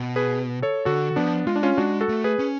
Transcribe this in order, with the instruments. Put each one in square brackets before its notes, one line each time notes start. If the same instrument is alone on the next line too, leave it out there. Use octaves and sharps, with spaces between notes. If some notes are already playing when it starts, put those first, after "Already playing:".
Already playing: [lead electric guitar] B2
[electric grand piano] G#4 B4
A4 C#5
[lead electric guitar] D3 [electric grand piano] F#4 A4
[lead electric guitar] F3 [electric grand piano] B3 D4
[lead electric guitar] G#3 [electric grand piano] F4
[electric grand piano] D4
C#4 F4
[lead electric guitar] G#3 [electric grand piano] D4 F#4
[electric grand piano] F#4 A4
[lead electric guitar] A3
[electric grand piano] G#4 B4
[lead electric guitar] C#4